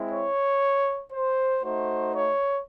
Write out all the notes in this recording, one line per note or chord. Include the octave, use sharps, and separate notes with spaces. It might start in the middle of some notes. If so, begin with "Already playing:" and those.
Already playing: G#3 C4 E4
C#5
C5
A3 D#4 F#4 C5
C#5